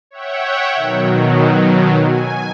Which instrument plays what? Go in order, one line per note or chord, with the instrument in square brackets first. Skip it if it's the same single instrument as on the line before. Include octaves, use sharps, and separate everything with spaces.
[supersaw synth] C#5 E5 F#5 G5
B2 D#3 F#3
G#5